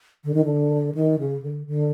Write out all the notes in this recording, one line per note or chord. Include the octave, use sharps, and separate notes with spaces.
D3
D#3
D3
D#3
C#3
D3
D3